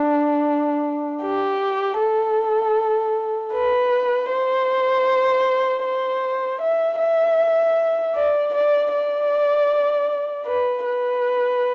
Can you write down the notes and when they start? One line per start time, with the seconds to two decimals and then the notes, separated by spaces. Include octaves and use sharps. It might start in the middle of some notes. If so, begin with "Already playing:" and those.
Already playing: D4
1.22 G4
1.99 A4
3.53 B4
4.30 C5
5.84 C5
6.61 E5
7.00 E5
8.15 D5
8.54 D5
8.93 D5
10.46 B4
10.85 B4